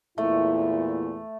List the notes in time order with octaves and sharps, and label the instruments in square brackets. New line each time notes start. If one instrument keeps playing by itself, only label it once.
[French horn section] E2 A#2 E4 [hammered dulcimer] A3